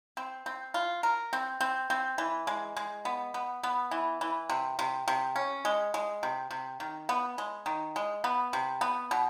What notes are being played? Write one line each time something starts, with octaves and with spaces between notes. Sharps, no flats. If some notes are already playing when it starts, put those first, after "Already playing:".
C4
C4
F4
A#4
C4
C4
C4
E3
G#3
G#3
B3
B3
B3
E3
E3
C3
C3
C3
C#4
G#3
G#3
C3
C3
D#3
B3
G#3
D#3
G#3
B3
C3
B3
B2